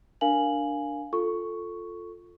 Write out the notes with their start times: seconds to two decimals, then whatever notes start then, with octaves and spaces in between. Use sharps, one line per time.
0.21 D4 A#4 F5 G#5 F#7
1.13 F4 A4 C#6